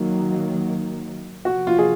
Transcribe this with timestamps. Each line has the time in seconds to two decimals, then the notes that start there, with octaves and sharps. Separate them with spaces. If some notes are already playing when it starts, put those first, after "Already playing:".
Already playing: D#3 F#3 A#3
1.45 C3 F3 A#3 F#4
1.67 F4
1.78 G#4